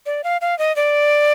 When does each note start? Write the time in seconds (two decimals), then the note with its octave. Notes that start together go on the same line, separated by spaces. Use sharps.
0.06 D5
0.24 F5
0.41 F5
0.59 D#5
0.76 D5